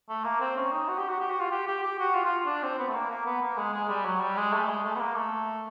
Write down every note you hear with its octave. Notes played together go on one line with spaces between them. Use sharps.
A3
A#3
C4
C#4
D#4
F#4
G4
F#4
G4
F#4
F4
G4
G4
G4
F#4
F4
F4
D4
C4
B3
A3
A#3
A#3
B3
A#3
G#3
G#3
G3
F#3
G3
G#3
A3
G#3
A3
B3
A#3
A3